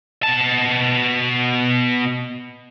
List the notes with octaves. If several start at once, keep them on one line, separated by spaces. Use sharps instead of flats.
B2 A5